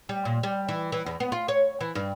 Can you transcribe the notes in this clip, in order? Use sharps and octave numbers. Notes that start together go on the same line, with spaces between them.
G3
A#2
G3
E3
E3
E2
B3
F4
C#5
E3
G2